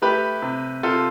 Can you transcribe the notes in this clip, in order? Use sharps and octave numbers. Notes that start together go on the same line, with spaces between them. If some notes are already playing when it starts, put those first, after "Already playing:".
A3 G4 B4
C3
C3 F4 A4